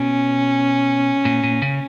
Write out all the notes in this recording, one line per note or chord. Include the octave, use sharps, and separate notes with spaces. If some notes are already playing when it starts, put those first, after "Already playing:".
Already playing: B2 C#4
A#2
A#2
C#3